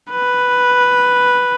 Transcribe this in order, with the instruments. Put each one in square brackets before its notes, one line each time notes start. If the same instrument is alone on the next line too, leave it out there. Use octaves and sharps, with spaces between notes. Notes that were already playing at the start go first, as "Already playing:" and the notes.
[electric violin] B4